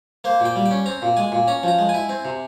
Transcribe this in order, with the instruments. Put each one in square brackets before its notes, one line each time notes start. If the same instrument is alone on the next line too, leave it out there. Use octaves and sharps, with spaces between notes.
[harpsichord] A#3 C5
A#2
G5
G3
G5
C#4
C4 A#5
A#2
G#3 G#5
A#2
C#4 A#5
F3 A#5
G#3
G#5
E4
C4
C3